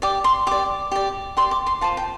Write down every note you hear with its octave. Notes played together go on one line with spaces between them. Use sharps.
G4 D5 D6
C6
G4 D5 D6
G4 D5
G4 D5 C6
D6
C6
F4 C5 A5
G5